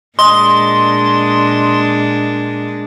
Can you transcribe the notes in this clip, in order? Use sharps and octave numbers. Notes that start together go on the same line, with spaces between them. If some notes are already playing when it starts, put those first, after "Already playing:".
A#2 G#3 D4 D#5 C6